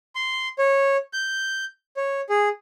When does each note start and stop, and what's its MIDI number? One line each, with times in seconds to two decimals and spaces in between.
0.16 0.48 84
0.59 0.97 73
1.13 1.65 91
1.97 2.21 73
2.30 2.48 68